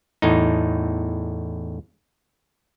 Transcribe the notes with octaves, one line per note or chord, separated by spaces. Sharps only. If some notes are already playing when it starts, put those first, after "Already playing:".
E2 A2 D#4